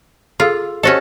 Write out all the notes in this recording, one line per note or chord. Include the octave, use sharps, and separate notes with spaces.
F4 G#4 A4 E6
C#4 F#4 G4 A4 C5 D#5